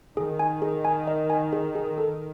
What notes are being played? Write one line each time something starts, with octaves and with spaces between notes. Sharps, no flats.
D#3 G#4
G#5
G#4
G#5
D#5
G#5
G#4
G#4
A4